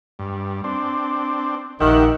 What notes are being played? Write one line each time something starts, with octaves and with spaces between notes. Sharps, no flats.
G2
C4 D4
A#1 D#3 G4 E5 F#5